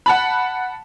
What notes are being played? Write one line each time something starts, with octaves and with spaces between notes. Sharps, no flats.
F#5 A5 B5